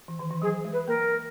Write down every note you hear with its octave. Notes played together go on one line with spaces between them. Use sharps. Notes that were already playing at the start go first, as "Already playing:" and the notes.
E3
D#3
E3
F#3 G#4
G#3
B4
A#3 A#4